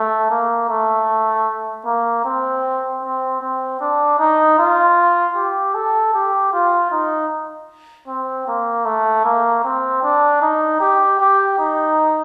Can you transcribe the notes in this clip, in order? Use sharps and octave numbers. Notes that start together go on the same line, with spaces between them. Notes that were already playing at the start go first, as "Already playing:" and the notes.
Already playing: A3
A#3
A3
A#3
C4
C4
C4
D4
D#4
F4
G4
A4
G4
F4
D#4
C4
A#3
A3
A#3
C4
D4
D#4
G4
G4
D#4